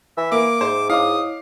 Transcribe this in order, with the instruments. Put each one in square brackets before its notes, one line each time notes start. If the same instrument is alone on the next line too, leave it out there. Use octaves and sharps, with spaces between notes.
[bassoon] E3 [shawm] E5
[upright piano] A#3 [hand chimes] E5 [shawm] D6
[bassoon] G#2 [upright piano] C5
[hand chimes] E4 C#5 D#5 [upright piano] F5 D6 [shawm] D#6